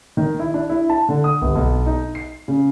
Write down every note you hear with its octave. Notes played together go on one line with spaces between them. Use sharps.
D#3
E4
D4
E4
A5
D3
D#6
G1
B1
D#4
C7
C#3